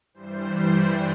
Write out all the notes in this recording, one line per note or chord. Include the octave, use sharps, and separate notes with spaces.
G2 E3 G3 C5